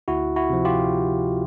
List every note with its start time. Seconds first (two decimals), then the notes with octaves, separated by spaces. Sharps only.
0.08 D2 E4 F#4
0.36 E4 F#4
0.50 C3 F3
0.65 F4 G4